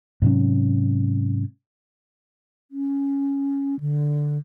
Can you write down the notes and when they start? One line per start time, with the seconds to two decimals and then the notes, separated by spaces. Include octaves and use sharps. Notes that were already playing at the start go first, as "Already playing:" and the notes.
0.22 G#2 C3 F#3 C#4
2.71 C#4
3.80 D3